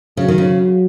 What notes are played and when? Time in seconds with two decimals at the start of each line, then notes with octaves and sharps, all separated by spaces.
0.17 C#3 F#3
0.28 D#3
0.38 C#3